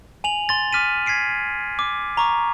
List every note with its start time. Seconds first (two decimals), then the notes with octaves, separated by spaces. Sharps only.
0.24 G#5 F7 F#7
0.49 C6 A6
0.73 D6 F6 B6 D#7
1.06 G#6 B6 C7 D7
1.79 D6
2.17 A#5 C#6 D6